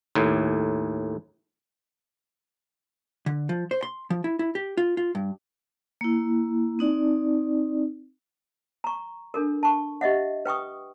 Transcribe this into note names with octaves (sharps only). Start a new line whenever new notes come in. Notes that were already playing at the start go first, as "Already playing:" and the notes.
D#2 A2
D3
F3
C5
C6
F3
E4
E4
G4
F4
F4
G2
A#3 E4
C4 D#4 D5
A#5 C#6
D4 A4 A#4
A5 C#6
G4 D#5 E5 F#5
B4 G5 C#6 D#6